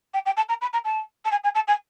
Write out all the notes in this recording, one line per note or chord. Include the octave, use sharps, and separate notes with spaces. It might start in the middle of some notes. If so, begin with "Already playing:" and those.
G5
G5
A5
A#5
B5
A#5
A5
A5
G#5
G#5
A5
G#5